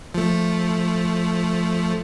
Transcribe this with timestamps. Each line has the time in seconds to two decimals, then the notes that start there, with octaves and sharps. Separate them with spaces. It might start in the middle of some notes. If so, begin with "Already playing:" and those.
0.14 F3 A3